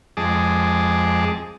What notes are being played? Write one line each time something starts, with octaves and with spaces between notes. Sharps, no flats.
F2 G#3 G#4 A5 D6